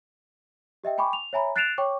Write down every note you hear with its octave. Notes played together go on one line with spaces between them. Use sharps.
G4 D#5 E5 G5
G5 G#5 B5 C#6 D6
F7
C#5 E5 G#5 A#5 B5
F#6 A6 C7 D7 E7 F7
C#5 G5 C#6 D6